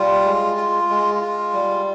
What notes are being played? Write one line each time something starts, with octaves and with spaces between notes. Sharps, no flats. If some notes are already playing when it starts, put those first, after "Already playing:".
Already playing: G3 F4
G#3
F4
G#3
F4
G3